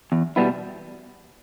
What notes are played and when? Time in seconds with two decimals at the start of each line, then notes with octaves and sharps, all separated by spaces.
0.12 E2
0.36 B2 G3 B3 E4